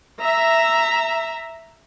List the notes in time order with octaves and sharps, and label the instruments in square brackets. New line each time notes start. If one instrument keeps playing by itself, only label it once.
[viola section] E5 [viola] A#5